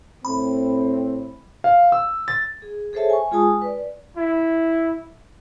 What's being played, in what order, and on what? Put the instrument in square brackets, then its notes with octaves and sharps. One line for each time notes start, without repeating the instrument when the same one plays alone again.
[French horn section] A2 A3 C4 [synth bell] B5
[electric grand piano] F5
E6
A6
[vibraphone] G#4
G#4 A4 C5 C#5 E5 A5
G#5 C#6
G#3 F4 G#4 G#5 A5 D#6
B4 D5
[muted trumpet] E4